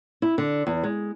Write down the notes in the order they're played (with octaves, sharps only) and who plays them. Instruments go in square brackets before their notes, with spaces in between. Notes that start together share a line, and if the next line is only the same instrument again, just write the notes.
[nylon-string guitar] E4
D3
E2
G#3